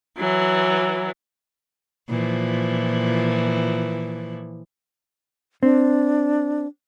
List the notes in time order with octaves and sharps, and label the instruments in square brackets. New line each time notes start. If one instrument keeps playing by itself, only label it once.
[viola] E3 F#3
[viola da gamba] A#2 E3 F3
[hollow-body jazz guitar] C4 [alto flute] D4